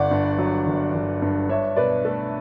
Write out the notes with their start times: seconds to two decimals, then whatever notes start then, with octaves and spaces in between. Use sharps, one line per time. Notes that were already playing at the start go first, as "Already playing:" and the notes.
Already playing: G1 D5 F#5
0.11 G2
0.38 F#3
0.66 G1
0.94 G1
1.22 G2
1.49 D4 C#5 E5
1.76 B2 B4 D5
2.05 A3 A4